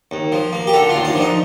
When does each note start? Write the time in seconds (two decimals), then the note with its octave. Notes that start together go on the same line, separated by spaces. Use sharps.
0.11 D#2
0.32 F3
0.53 A#3
0.67 G4
0.74 D3 A4
0.89 F4
0.95 D#2
1.05 D4
1.15 F3 D#4